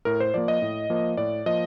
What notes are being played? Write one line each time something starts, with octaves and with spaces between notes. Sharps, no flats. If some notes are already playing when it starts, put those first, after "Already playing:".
A2 A#4
C5
F3 A#3 D5
D#5
A2
F3 A#3
A2 D5
F3 A#3 D#5